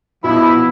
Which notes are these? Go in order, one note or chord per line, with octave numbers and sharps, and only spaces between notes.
B2 F3 B3 E4